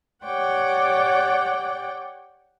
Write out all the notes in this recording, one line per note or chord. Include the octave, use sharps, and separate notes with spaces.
G4 C#5 D5 F#5 G5 D6